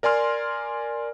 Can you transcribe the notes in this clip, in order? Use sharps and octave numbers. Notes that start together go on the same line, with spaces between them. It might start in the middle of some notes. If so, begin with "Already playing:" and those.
A#4 D5 G#5 C6 F6